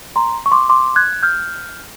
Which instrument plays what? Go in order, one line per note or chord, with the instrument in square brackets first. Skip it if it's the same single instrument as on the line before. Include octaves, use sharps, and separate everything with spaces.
[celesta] A#5 C6
C#6
C6 D6
C6 D6
F#6 G#6
F6 G6